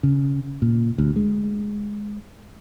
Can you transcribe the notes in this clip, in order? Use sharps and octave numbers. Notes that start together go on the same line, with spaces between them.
C#3
A#2
D2
G#3